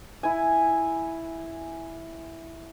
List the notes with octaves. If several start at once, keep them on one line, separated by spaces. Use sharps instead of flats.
E4 G#5